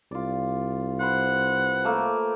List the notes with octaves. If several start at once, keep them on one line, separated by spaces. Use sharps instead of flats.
C2 F4 D5
B4 C5 F#5
A3 A#3